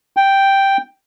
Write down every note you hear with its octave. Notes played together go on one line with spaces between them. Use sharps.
G5